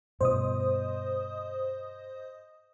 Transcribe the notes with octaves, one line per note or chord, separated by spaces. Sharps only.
G2 B2 F3 C5 D#5 D#6